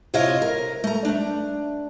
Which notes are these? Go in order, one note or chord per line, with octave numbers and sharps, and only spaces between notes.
C3 E4 F4 C#5 D#5 F5
A#4
A3 A#5
A3 D4